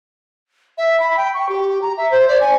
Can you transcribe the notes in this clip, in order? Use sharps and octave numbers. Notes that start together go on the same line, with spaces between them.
E5
B5
G5
C#6
G4
A#5
E5
C5
D5
G#5